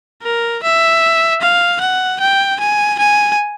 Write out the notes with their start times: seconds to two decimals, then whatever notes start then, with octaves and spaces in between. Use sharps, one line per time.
0.23 A#4
0.62 E5
1.41 F5
1.81 F#5
2.20 G5
2.60 G#5
2.99 G#5